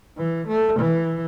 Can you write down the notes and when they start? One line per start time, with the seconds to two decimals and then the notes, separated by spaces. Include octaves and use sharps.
0.18 E3
0.48 A3
0.80 E3